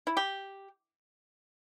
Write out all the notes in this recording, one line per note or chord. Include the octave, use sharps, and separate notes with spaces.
E4
G4